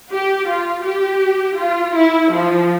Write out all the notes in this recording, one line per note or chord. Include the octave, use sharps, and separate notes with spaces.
G4
F4
G4
F4
E4
F3